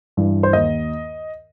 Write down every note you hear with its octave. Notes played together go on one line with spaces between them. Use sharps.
G2 E3
C5
D#2 D#5